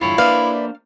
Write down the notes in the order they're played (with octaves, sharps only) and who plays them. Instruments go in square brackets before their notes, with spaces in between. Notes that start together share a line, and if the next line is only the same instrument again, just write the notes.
[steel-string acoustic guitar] E2 G2 D3 [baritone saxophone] E4 [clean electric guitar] F4 C#5
[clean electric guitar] A#3 D4 C5 [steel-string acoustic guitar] B4 D5 E5 [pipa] F5